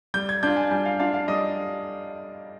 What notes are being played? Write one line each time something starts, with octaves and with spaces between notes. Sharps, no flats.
G3 G6
G#6
D4 F4 G6
G#5
G3 G#5
F5
D4 F4 F5
F5
G3 D#5